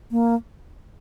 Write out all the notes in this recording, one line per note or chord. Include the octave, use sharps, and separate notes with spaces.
A#3